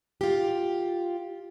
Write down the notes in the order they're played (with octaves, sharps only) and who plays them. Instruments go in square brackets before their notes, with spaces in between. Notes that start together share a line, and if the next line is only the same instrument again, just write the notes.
[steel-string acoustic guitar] F4 G4